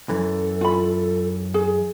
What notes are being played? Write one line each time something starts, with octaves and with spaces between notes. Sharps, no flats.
F#2 E3 A4
F4 B5
G#4